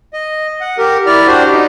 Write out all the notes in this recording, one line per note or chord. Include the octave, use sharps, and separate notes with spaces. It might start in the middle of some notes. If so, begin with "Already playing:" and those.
D#5
F#5
G4 A#4
E4 D5 F6
D4 F#4 G4 C5
D#4